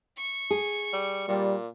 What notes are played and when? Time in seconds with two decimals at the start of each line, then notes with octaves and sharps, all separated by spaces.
0.17 C#6
0.51 G#4
0.93 G3
1.28 A#2 G3